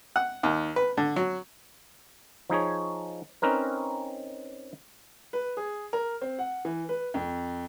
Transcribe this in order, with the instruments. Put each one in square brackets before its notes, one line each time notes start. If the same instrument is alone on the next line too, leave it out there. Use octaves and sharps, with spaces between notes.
[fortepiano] F#5
D#2
B4
D3
F#3
[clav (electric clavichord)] F3 D#4 G#4 C#5
C4 C#4 D#4 A#4 B4
[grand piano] B4
G#4
A#4
C4
F#5
E3
B4
F2